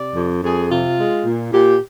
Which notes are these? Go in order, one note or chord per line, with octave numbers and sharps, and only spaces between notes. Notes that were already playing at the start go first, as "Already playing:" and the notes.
Already playing: C3 D5
F2
F2 G#4
C3 F4
G#3
A#2
A#2 G4